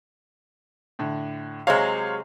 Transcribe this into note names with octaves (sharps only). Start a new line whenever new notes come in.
A2 D3
C3 F#3 G#3 C5 C#5 F5